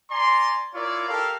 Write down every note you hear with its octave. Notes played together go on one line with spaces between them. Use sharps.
D5 G#5 A#5 C6
E4 F4 A#4 C#5 D5
G4 A4 A#4 F5